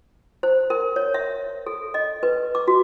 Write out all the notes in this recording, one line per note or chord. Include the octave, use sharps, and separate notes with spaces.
C5
A#4
C#5
E5
A4
D#5
B4
D6
F#4